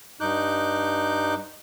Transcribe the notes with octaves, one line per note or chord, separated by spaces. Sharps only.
G2 D#4 D6 F#6 G6